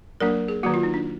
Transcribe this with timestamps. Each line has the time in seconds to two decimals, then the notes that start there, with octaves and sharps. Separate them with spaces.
0.20 F#3 A#3 D4 A#4
0.48 G#4
0.63 D#3 F#3 A#3 F#4
0.74 F4
0.83 D#4
0.94 D4